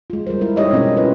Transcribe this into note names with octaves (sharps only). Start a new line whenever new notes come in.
G#3 F4
G3 F4 A#4 C5
G#3 E4 A#4
D#4 G4 C#5 D#5 E5
B2 C4 C#4 F4 G#4 A#4
E4 F4 B4